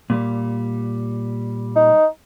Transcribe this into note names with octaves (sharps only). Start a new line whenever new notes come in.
A#2 G3
D#4